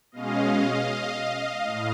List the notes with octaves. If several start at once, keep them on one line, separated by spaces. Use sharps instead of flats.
B2 G#3 C#4 D#5 F5
A2